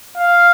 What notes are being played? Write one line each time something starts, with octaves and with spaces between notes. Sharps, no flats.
F5